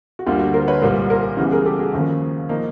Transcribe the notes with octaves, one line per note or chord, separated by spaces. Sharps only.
F#4
D2 D3 G3 A#3 F4
F#4
A#4 C5
B4 C#5
C2 A#2 G3 A#4 C5
A#4 C5
C#3 E3 G3 B3
G#4 A#4
G4 A4
F#4 G#4
D#2 C#3 F3 A#3
F3 A#3 D#4